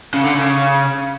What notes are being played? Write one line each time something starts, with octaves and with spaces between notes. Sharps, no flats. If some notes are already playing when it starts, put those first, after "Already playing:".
C#3
D3
C#3